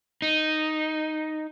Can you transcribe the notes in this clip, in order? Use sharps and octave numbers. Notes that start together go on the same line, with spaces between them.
D#4